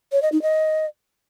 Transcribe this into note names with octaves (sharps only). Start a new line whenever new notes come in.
C#5
D#5
D#4
D#5